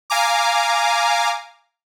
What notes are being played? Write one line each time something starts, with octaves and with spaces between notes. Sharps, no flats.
F5 G#5 A#5 D6